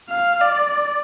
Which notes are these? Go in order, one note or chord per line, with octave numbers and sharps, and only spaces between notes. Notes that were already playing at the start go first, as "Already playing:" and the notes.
F5
D5